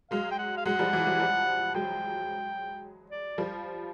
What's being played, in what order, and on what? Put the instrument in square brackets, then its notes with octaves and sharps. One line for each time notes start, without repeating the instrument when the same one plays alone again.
[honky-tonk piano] F#3 G#3 [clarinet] F5
[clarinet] G5
F#5
F5
[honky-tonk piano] F#3 G#3 [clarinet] F#5
[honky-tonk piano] F3 G3
E3 F#3
E3 F#3
F3 G3
[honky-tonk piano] F#3 G#3 [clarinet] G5
[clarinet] D5
[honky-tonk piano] F3 G3